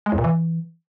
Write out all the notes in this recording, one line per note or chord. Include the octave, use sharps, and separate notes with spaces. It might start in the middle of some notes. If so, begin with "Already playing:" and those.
G#3
E2
A#2
E3